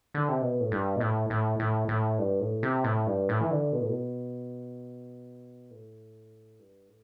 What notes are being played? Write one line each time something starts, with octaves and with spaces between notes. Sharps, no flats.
D3
C3
B2
A2
G2
B2
A2
A2
A2
A2
G2
A2
C3
A2
G2
A2
E3
D3
B2
A2
B2
A2
G2
A2